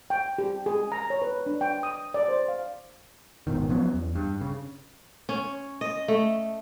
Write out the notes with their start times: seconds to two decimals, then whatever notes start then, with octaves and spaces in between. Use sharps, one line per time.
0.10 G5
0.38 G4
0.66 G#4
0.92 A#5
1.10 C#5
1.22 B4
1.46 D4
1.61 G5
1.83 D#6
2.14 D5
2.28 C5
2.48 F5
3.47 G#1 B2 D#3
3.69 F3 F#3 B3 C#4
3.94 E2
4.15 G2
4.41 C#3
5.29 C#4
5.81 D#5
6.08 A3